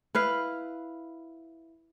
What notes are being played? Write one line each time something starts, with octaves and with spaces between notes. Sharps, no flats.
E4 B4 F5